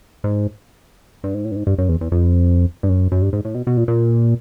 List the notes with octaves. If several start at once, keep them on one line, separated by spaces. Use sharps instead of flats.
G#2
G2
G#2
A2
G2
G#2
G2
F#2
E2
E2
F2
G2
F#2
F#2
G2
G#2
A2
B2
B2
A#2
A#2